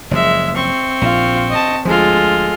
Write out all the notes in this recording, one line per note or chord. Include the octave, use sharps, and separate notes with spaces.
F#1 F3 G#3 E5
C4 C#6
A#1 F4
D#5 A5
D2 F3 G#3 F4 A4